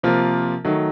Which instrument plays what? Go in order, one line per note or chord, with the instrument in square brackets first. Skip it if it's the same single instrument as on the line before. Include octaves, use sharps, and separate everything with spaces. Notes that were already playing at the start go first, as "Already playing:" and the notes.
[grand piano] C3 F3 A#3 F4 A#4
D#3 F#3 A3